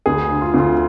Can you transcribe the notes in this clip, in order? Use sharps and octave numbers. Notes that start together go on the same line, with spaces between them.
D2 G#4
D3
F4
D2
F4